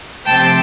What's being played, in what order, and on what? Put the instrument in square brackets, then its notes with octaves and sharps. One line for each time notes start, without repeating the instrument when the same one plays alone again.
[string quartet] C3 F3 A3 C4 G5 A5